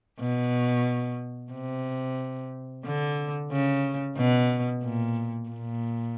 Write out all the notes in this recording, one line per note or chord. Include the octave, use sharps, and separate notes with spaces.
B2
C3
D3
C#3
B2
A#2
A#2